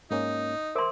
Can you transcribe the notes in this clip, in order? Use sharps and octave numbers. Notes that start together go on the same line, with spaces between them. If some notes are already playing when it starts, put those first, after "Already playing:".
G#2 A#3 C#4 D#4
A#4 C5 E5 C6 D6